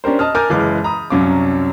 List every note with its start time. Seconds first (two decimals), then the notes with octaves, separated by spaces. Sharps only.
0.04 C#4 D4 G4 A#4 C5
0.19 D#5 A5 D#6 F6
0.35 A#4 G#5 D6 F6 G6 A6
0.50 F#1 E3 G#3 F5 D6 F6
0.84 A#5 B5 D#6
1.10 C2 F#2 F#3 C#4 F5 D6